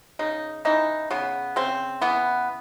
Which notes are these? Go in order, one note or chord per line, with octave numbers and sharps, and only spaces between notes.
C#3 D#4
E3 D#4
C#3 B3
C#3 C4
E3 B3